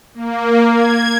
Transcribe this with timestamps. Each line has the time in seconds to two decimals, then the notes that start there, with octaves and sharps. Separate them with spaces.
0.15 A#3
0.71 G#6